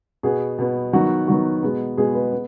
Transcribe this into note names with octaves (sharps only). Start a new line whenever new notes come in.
B2 B3 G#4
B2 B3
D#3 F#3 B3 F#4
D#3 F#3 B3 F#4
B2 G#3 B3
B2 G#3 B3 G#4
B4
B3